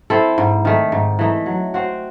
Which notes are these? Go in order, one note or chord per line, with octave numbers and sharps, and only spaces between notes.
C4 E4 A4
G#2
D#3 A3
G#2
E3 A3 D#4
F#3
C4 F#4